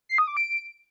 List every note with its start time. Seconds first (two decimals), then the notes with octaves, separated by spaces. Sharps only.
0.09 C7
0.18 D#6
0.27 D6
0.37 D7